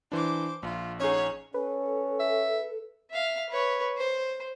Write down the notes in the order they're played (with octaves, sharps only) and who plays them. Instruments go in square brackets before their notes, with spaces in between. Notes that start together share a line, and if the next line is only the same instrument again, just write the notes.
[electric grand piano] E3 D4 [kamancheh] C5 D6
[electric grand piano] A#1 [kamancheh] F4
[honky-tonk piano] C#4 G#4 [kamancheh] D#4 F#5 [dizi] C#5
[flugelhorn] C#4 [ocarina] A4 [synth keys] B4
[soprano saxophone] E5
[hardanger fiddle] E5 F5
B4 C#5
C5